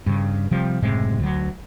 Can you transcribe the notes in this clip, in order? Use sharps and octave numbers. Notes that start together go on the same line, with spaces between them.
G2 C#3
C3 F3 G3
F#1 A2 C3 G#3
D2 F#3